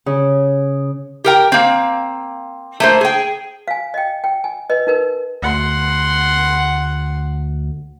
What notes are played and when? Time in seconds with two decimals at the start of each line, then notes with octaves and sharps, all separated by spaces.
0.06 C#3
1.24 G4 A#4 G5
1.52 A#3 C4
2.80 A3 A#3 C5
3.01 G#4 G5
3.68 F5 G#5
3.94 D#5 G5
4.24 G5
4.44 G#5
4.70 B4 D#5
4.87 D#4 A#4 B4
5.43 D2 F#5 C6